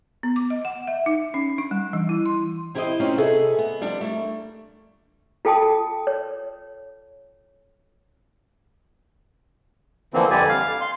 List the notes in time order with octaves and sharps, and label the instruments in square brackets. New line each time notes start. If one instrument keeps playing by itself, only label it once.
[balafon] B3
D6
D#5
F#5
E5
D#4
C#4
D4
G3
E3
E4
C6
[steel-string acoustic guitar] C4 E4 G4 A#4 C5 D#5
C4 C#4 D#4 F4 C5
C3 G#4 A4 B4 D#5 E5
B3
F3 G3 D4
A3 A#3
[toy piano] F4 A4 G5 A5 D#6
C#5
[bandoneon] D3 E3 F3 A#3 C4
F2 D3 G3 G4 D5 G#5
F5
C6